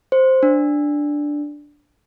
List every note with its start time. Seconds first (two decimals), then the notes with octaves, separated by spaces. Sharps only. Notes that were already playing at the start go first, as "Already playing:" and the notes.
0.12 C5
0.43 D4